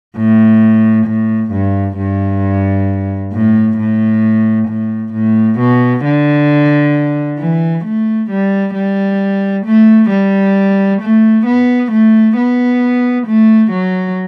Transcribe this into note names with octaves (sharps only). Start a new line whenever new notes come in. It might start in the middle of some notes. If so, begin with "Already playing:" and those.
A2
A2
G2
G2
A2
A2
A2
A2
B2
D3
E3
A3
G3
G3
A3
G3
A3
B3
A3
B3
A3
F#3